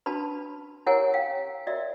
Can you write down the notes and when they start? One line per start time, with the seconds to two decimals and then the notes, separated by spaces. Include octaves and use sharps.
0.06 D4 F#4 B4 A5 B5
0.86 E4 G4 A#4 C#5 F#5 G#5
1.14 F5 G5
1.67 F#4 A#4 C#5 D5 E5